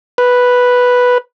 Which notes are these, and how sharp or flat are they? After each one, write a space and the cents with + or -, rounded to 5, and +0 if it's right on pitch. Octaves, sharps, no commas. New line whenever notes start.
B4 -5